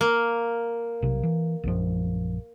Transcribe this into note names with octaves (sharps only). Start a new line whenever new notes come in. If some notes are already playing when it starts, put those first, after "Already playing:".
A#3
B1 C3
E3
A#1 F#2 F3